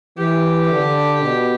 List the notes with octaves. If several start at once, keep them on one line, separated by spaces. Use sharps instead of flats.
E3 G4
D3
B2